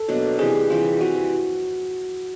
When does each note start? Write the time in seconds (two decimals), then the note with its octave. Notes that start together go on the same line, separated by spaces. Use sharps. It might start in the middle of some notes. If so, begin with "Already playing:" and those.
Already playing: A4
0.08 B2 F#3 A#3 D4
0.39 C3 E3 G3 G#4
0.70 C3 E3 G3 F4
1.01 C3 E3 G3 F#4